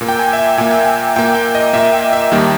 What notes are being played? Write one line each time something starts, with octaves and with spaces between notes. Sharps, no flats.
A#2 A#3
G5
G#5
E5
G5
A#2 A#3 G#5
G5
G#5
A#2 A#3 G5
G5
D#5
A#2 A#3 E5
G5
E5
D#2 D#3 G3 A#3 G5